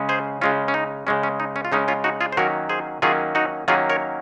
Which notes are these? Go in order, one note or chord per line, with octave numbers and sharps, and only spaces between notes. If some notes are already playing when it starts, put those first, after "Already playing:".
Already playing: C#3 G#3 C#4
G#4 C5
C#3 G#3 C#4 F4
C#4
D#4
C#3 G#3 C#4
C#4
D#4
C#4
F4
C#3 G#3 C#4 D#4
C#4 F4
D#4 F#4
F4 G#4
C5
D#3 F#3 A#3 C#4 F#4 A#4
G#4 C5
D#3 F#3 A#3 C#4 F4 G#4
D#4 F#4
D#3 F#3 A#3 C#4 F4 G#4
A#4 C#5